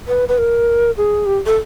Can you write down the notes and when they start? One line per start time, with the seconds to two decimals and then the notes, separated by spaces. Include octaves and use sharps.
0.08 B4
0.29 B4
0.38 A#4
0.97 G#4
1.26 G4
1.46 A4